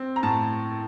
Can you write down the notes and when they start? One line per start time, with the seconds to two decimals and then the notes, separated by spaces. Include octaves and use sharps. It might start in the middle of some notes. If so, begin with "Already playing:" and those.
Already playing: C4
0.16 A#5
0.23 A2 A5